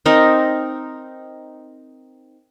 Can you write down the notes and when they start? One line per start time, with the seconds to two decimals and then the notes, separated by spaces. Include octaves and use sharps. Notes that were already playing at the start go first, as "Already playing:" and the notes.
0.06 C4 D#4 A#4